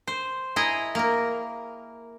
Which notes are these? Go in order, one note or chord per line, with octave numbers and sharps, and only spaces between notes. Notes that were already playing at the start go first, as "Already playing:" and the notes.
C5
E4 G#4 D#5 A#5
A#3 A#4